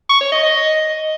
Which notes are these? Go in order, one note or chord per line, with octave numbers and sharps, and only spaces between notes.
C#6
C#5
D#5
D#5